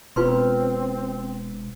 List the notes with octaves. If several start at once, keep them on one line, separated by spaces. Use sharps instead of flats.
E1 B2 C4 F4 B4 C6